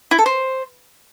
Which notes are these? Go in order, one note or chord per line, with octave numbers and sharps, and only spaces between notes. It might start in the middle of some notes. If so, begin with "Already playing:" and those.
E4
A4
C5